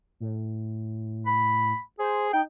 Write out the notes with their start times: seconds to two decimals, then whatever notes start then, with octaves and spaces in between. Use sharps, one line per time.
0.20 A2
1.27 B5
1.99 G#4 C5
2.33 D#4 G5